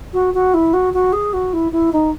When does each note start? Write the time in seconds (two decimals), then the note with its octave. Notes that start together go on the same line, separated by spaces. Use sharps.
0.13 F#4
0.34 F#4
0.54 E4
0.73 F#4
0.93 F#4
1.12 G#4
1.33 F#4
1.53 E4
1.72 E4
1.92 D#4